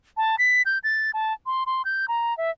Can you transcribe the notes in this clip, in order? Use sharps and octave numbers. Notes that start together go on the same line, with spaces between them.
A5
B6
G6
A6
A5
C6
C6
G6
A#5
E5